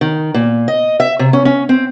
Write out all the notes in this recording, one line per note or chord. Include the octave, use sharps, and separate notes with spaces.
D#3
A#2
D#5
E5
C3
C#4
C#4
C4